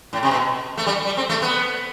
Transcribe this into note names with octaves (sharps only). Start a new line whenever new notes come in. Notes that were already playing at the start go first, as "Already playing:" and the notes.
A2
C3
B2
A3
G3
G3
C4
A3
B3